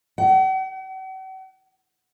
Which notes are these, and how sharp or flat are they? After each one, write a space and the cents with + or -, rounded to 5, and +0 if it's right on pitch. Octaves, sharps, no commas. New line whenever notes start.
F#5 +45